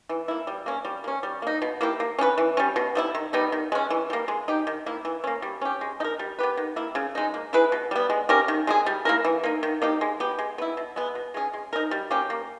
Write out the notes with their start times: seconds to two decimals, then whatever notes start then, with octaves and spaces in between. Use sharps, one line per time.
0.09 E3
0.28 A#3 E4
0.47 G3
0.66 A#3 C#4
0.85 G3
1.04 A#3 C#4
1.23 G3
1.42 A#3 D#4
1.62 B2
1.81 A#3 E4 G4
2.00 A#3
2.19 C#4 G4 B4
2.38 E3
2.57 G3 C#4
2.76 B2
2.95 G3 B3 E4
3.15 D#3
3.33 G3 B3 D#4
3.52 D#3
3.72 G#3 C#4
3.90 E3
4.10 G3 A#3
4.28 G#3
4.48 D#4 G4
4.67 D#3
4.86 A#3 E4
5.05 E3
5.24 A#3 C#4
5.42 G3
5.61 C#4 G4
5.81 G#3
6.00 D#4
6.04 A#4
6.19 G3
6.39 B3 G4 B4
6.57 D#3
6.76 A#3 E4
6.95 C#3
7.15 G#3 D#4
7.34 A#3
7.53 E4 G#4 B4
7.72 B2
7.91 G3 B3
8.10 G#3
8.29 C#4 G4 A#4
8.48 D#3
8.67 G#3 D#4 G#4
8.86 G3
9.05 A#3 E4 A#4
9.25 E3
9.44 A#3 D#4
9.63 D#3
9.82 A#3 D#4 G4
10.01 G#3
10.20 B3 G4
10.39 G#3
10.58 B3 E4
10.77 B2
10.96 G#3 B3
11.15 B2
11.34 G#3 C#4 G#4
11.53 G#3
11.73 D#4 A#4
11.91 G3
12.11 A#3 C#4 G4
12.30 A#3